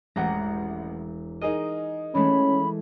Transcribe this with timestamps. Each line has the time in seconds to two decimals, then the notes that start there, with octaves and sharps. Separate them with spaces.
0.16 E1 A1 F#5 A#5
1.41 D#4 G#4 A#4 D#5
2.15 E3 G#3 A3 C#4 B5